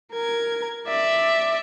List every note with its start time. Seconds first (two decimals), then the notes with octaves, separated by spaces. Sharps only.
0.13 A#4 G#6
0.88 D5 E5